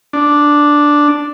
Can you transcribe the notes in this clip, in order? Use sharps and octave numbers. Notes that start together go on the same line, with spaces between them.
D4